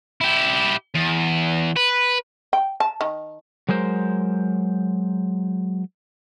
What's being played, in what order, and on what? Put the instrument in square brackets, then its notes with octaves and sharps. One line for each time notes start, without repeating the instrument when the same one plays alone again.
[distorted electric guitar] E4 G4
E2
B4
[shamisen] G5
A5
D#3
[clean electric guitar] F#3 G#3 A#4 C5